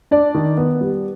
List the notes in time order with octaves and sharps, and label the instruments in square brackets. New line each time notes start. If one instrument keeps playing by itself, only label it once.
[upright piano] D4 D5
D#3
B3
G3